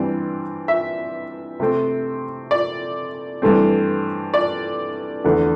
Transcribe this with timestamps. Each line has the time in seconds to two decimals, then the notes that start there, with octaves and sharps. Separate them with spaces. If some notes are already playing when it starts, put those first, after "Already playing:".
Already playing: G2 E3 G3 C4
0.68 E5
1.60 C3 A3 C4
2.51 D5
3.42 G2 E3 A3 C4
4.34 D5
5.24 E2 D3 A3